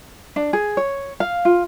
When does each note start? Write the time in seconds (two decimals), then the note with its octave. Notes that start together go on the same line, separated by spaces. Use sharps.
0.36 D4
0.53 G#4
0.77 C#5
1.20 F5
1.45 F4